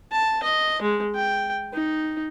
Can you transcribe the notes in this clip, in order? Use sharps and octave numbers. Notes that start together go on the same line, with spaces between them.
A5
D#5
G#3
G5
D#4